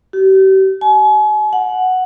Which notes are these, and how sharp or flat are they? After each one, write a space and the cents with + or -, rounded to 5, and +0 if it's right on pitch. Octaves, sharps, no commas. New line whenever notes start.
G4 -40
G#5 +40
F#5 +0